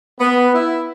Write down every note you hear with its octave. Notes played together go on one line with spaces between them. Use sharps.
B3
E4